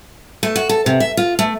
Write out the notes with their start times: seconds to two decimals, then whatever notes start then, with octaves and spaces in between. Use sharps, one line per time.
0.43 A3
0.56 F#4
0.69 A4
0.86 C3
1.00 E5
1.17 F4
1.39 A3